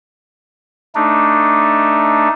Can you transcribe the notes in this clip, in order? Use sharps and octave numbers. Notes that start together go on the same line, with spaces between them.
A3 D4 D#4